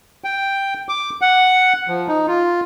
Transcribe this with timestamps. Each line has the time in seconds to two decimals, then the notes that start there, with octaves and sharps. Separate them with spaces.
0.24 G5
0.89 D6
1.21 F#5
1.88 F3
2.08 D#4
2.28 F4